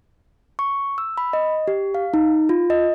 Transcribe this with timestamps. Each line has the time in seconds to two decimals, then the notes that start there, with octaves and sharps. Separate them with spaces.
0.59 C#6
0.98 E6
1.18 B5
1.33 D#5
1.68 G4
1.94 F5
2.14 D#4
2.49 F4
2.70 D#5